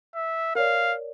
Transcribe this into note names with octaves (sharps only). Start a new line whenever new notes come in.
E5
A#4 C#5 D5 F5